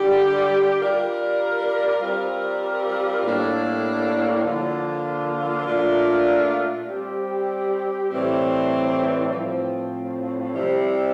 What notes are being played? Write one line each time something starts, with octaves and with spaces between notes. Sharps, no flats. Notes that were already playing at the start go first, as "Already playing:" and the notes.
Already playing: D3 G3 D4 G4
G3 D4 F4 A#4
G3 C4 F4 A#4
A2 G3 A#3 D4 A4
D3 F3 A#3 F4
A#2 A3 D4 F4 A#4
G3 C4 G4
A2 E3 G3 C4
A2 F3 C4
C3 G3 C4 E4 G4